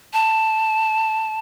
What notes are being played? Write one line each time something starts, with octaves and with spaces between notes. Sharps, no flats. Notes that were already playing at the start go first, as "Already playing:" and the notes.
A5